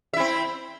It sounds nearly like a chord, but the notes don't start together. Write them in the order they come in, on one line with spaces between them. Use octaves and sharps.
E5 E4 C4